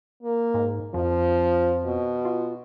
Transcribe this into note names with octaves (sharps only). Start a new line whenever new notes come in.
A#3
G#2
F2 F3
B2
F4